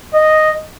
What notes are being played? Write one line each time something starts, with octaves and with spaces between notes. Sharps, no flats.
D#5